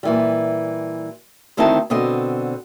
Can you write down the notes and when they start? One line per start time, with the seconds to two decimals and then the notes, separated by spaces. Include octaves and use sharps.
0.03 A#2 E3 G3
1.57 D2 D#3 C4 E4 D#5 A5
1.90 B2 D3 C4 D#5